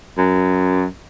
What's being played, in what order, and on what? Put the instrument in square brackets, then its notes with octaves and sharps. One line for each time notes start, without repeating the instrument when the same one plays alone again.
[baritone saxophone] F#2